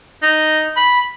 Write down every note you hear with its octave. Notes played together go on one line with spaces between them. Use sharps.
D#4
B5